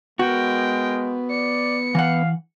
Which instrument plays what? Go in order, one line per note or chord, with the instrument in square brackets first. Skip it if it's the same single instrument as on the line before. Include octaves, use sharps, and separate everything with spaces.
[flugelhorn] G#3 [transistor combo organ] B3 [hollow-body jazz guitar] F#4 [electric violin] A#4 G5
[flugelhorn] D5 [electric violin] C#7
[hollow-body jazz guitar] E3 F#5 [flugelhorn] F5